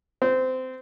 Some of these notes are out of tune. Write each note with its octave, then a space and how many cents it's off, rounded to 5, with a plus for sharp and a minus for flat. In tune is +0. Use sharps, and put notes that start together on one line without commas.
C4 -20